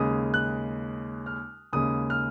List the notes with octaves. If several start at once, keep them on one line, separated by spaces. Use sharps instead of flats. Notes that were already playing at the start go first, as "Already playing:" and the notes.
Already playing: D#2 C#3 G#3 D#6
F#6
F6
D#2 C#3 G#3 D#6
F6